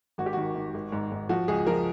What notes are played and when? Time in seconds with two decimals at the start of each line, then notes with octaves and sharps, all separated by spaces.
0.18 G#1 F#4
0.26 G4
0.33 D#3 F#4
0.55 D#3
0.74 G#1
0.92 G#2
1.12 G#2
1.29 F3 F#4
1.48 C#2 G#4
1.67 F3 A#4